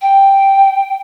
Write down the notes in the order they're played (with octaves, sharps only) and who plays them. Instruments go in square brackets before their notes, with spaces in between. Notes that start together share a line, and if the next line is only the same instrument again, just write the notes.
[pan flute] G5